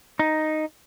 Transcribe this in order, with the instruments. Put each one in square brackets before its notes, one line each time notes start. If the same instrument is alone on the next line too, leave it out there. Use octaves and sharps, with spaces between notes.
[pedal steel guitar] D#4